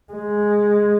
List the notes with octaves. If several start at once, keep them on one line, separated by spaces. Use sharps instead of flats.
G#3